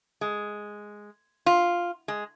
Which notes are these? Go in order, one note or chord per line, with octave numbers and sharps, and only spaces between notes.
G#3
F4
G#3